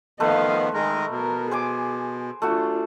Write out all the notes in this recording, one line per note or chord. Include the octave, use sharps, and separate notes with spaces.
D#3 F3 A3 B3 B4 C5 D#5 F5
D#3 G#3 G#4 A#4 D#5
B2 A#4
G#4 C5 G#5 D6
A3 D4 F4 F#4